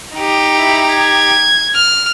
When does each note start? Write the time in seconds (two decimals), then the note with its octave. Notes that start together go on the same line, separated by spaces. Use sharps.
0.15 D#4 G4
0.58 E4
0.91 G#6
1.75 F6